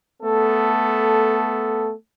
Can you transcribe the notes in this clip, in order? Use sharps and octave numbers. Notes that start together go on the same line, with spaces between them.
A3 B3 A4